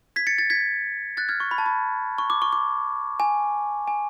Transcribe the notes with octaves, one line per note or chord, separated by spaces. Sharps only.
G#6 B6
A6 C#7
A6
G#6 B6
F#6 A6
F6 G#6
C#6
B5
A5
B5
C#6
D6
C#6
D6
G#5
G#5